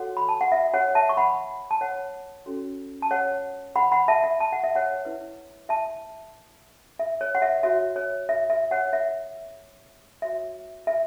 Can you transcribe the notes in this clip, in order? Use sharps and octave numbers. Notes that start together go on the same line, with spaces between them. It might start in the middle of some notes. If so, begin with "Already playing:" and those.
Already playing: F#4 A4 C#5 F#5
B5
A5
F#5
E5
C#5 F#5
E5 A5
C#6
F#5 B5
A5
C#5 F#5
C#4 F#4 A4 C#5
A5
C#5 F#5
F#5 B5
F#5 B5
E5 A5
E5
A5
F#5
E5
C#5 F#5
E4 B4
E5 A5
E5
C#5
F#5
E5
F#4 C#5 E5
C#5
E5
E5
C#5 F#5
E5
F#4 C#5 E5
E5